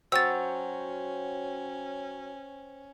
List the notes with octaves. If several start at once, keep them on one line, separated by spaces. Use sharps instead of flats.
F#3 C#4 C5 G5 C#6 E6 A6